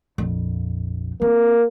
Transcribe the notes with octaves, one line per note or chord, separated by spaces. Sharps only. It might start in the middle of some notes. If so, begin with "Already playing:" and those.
A#1 F2
A#3 C4